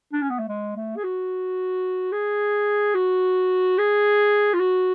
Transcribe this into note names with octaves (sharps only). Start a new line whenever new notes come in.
D4
C#4
B3
A3
G#3
A3
G#4
F#4
G#4
F#4
G#4
F4
F#4